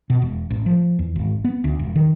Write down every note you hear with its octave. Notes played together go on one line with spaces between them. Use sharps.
B2
E1
A1
F3
E2
G#1
B3
D2
E1
D#3